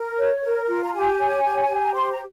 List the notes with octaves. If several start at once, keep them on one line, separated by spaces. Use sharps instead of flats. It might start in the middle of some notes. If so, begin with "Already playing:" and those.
Already playing: A#4
C#5
A#4
F4
A#5
G4 G#5
C#5
G4
G4
A#5
C5 C6
A#5